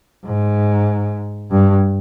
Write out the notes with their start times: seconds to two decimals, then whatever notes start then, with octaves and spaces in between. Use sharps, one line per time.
0.25 G#2
1.51 G2